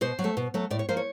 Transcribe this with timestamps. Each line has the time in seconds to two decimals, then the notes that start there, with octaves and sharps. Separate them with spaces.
0.01 B2 C5
0.19 F#3
0.24 A3
0.37 B2
0.54 F#3 A3
0.70 A2 D5
0.79 C#5
0.89 F3 A#3 C5
0.97 C#5